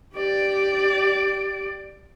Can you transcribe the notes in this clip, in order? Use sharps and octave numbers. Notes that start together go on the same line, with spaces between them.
G4 D5